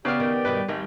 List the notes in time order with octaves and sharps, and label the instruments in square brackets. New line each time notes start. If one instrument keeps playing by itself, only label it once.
[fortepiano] C#3 F6 [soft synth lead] B3 [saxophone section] G4 D5
[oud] D#3
[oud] G2 B2 D#3 [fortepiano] B4
[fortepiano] G#1 [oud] D#3 G3